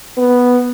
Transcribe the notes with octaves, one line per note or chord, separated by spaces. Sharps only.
B3